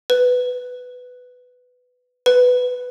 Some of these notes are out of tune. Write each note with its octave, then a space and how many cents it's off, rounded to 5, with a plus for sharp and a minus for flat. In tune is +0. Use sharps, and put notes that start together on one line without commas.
B4 +10
B4 +10